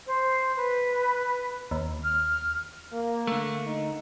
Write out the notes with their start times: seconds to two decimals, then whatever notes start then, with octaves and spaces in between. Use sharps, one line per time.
0.07 C5
0.57 B4
1.71 D#2
2.04 F6
2.93 A#3
3.27 D3 A3
3.67 D#4